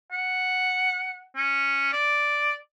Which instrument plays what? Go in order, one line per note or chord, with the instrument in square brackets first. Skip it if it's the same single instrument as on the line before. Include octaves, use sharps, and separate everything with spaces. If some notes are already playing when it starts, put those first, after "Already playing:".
[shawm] F#5
C#4
D5